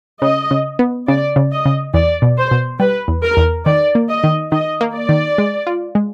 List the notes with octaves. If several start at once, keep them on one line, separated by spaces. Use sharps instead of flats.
C#3 D#5
C#3
B3
C#3 D5
C#3
D#5
C#3
E2 D5
B2
C5
B2
G3 B4
E2
A#4
E2
D#3 D5
A#3
D#5
D#3
D#3 D#5
A#3
D5
D#3
G#3
F4
G#3